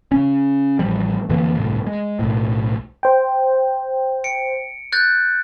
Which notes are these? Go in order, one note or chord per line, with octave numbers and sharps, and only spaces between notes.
C#3 C#4
A1 F3 G3
F2 D3 E3 A#3
G1 C2 A2
G#3
B1 A2
C5 G5
C#7 D7
F#6 G6 A6